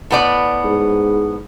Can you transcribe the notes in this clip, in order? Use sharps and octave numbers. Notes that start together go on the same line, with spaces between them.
A2 B3 D5
G#2